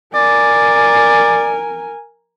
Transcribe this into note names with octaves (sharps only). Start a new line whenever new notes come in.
A#4 D5 G#5